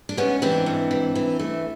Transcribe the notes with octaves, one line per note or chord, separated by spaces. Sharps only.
D4
G#2 B3 C#4
E3 C4 D4
G#2
E3
E3
A3